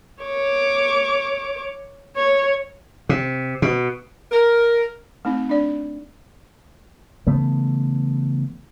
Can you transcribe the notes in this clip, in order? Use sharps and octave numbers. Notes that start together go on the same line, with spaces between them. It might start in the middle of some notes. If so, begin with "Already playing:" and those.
C#5 D6
C#5
C3
B2
A#4
A3 C4 D#4
D4 D5
C#3 E3 A3 B3